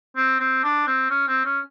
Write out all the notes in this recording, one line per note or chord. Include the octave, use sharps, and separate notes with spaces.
C4
C4
D4
C4
C#4
C4
C#4